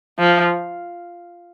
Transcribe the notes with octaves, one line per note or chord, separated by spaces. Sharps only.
F3